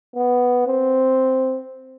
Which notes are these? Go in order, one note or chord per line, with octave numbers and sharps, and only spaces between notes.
B3
C4